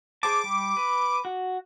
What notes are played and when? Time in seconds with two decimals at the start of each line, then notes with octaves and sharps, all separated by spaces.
0.23 G#4 C5 A5 D6
0.44 G3
0.77 B4
1.25 F#4